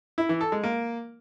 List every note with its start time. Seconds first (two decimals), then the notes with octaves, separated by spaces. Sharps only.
0.18 E4
0.29 E3
0.41 A4
0.52 G#3
0.64 A#3